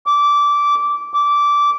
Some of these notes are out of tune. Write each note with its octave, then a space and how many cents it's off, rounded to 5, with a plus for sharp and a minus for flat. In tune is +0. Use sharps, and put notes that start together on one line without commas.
D6 -15
D6 -15